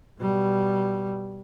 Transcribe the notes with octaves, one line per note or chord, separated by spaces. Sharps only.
B2 G3